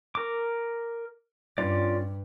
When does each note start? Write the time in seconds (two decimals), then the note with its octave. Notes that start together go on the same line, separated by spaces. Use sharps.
0.15 A#4 D6
1.58 G2 C#4 F4 D5